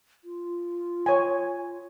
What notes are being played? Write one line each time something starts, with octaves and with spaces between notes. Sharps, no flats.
F4
C#5 G#5